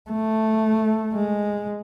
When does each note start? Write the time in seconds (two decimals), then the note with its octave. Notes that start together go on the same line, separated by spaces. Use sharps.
0.10 A3
1.14 G#3